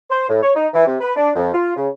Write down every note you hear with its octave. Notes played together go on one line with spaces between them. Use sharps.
C5
A2
C#5
D#4
E3
C3
B4
D4
F2
F4
C#3